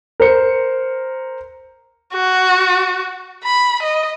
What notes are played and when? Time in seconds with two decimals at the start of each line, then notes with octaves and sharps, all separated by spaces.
0.20 A#4 C5 C#7
2.14 F#4
3.43 B5
3.83 D#5